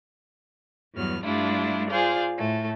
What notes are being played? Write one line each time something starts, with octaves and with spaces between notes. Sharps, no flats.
E2 G2 F#3 B3 F6
G2 G3 A3 D4 E4 F4
F4 G#4 C5 D5 F5
A2 A3